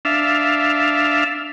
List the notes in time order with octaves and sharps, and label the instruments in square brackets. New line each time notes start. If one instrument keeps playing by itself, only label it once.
[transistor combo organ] D4 E5 F5